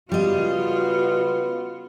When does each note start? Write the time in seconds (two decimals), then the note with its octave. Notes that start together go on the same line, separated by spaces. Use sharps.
0.12 C#3 G3 B3 F4 F#4 D#5